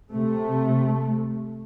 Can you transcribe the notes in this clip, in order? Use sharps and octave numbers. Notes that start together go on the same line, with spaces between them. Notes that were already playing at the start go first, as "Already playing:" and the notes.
C3 A3